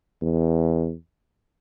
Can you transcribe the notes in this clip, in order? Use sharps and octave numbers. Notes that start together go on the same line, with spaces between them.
E2